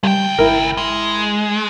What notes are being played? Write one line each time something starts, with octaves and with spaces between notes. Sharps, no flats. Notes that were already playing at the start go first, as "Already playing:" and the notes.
C#2 G3 G5
G#1 E4 A#4
G#3